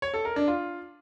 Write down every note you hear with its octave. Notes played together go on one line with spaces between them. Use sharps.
C#5
A4
A#4
D4
F4